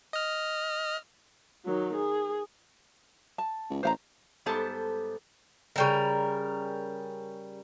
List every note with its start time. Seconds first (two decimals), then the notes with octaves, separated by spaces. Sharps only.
0.13 D#5 F6
1.65 D#3 F#3
1.95 G#4
3.38 A5
3.70 C#2
3.83 A1 C5 F5 A#5
4.46 G#2 G3 B3 A4 C5 A5
5.76 C#3 G3 A#4